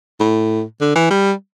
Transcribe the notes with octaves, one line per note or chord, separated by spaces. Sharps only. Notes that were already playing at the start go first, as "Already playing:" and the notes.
A2
D3
E3
G3